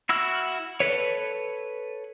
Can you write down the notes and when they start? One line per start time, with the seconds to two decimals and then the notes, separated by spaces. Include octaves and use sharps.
0.09 E4 F#4 E6 F6
0.80 A4 B4 C#5